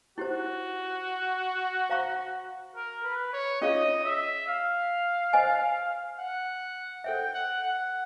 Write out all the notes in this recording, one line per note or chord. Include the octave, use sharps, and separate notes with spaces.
E4 F#4 G4 C5
C5 F5 A#5 C#6
A#4
B4
C#5
C#4 F4 G#4 C#5 D#5 F5
E5
F5
C5 D#5 G#5
F#5
A4 C5 E5 G5
F#5
F#5